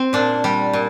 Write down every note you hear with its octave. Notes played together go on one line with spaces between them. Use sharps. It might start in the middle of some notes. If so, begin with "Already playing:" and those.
Already playing: C4
A#2 D4
G3
A#2